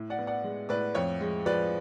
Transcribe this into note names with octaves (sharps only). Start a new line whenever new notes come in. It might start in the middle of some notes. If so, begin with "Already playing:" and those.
Already playing: A2
D5 F#5
B3
D5 F#5
G#3
A2 B4 D5
F2 C#5
G#3
F3 B4 D5